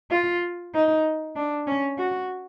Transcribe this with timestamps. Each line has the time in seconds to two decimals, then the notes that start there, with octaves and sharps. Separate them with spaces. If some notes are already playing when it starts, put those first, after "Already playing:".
0.11 F4
0.74 D#4
1.36 D4
1.67 C#4
1.98 F#4